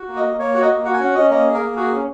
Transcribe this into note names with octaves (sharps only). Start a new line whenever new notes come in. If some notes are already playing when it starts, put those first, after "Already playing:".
Already playing: F#4
A#3
D#5
A#3
A#3 C#5
F#4 F#5
D#5
A#3
F#4 F#5
G#5
C#4 F#5
C#4 D#5
A#3 D#5
G#4
A#4
A#3
F#4 G#4
C#4